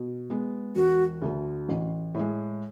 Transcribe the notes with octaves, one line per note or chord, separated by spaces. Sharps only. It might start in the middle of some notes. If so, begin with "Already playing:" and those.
Already playing: B2
G#3 B3
E1 F#4
D2 D3
A1
A2 G#3